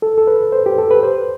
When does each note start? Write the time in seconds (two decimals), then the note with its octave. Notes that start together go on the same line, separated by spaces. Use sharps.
0.02 A4
0.18 A4
0.27 B4
0.52 C5
0.66 G4
0.78 A4
0.91 B4
1.03 C5